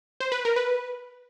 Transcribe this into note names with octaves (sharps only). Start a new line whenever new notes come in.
C5
B4
A#4
B4